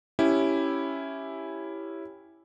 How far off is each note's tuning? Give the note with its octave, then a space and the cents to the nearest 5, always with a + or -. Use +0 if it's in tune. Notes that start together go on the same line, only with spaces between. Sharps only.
C#4 +0 E4 +0 G4 +0